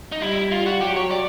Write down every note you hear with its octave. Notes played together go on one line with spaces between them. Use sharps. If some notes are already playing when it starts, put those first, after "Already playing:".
D#4
G3 E4
F4
F#4
F#3 G4
C#5
D5